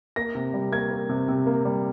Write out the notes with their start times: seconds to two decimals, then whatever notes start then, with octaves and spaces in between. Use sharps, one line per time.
0.16 A#3 A#6
0.35 C3
0.54 G3
0.72 A#3 G#6
0.91 A#3
1.09 C3
1.28 C3
1.46 A#3
1.65 G3